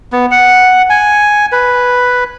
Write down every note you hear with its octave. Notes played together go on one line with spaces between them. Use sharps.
B3
F#5
G#5
B4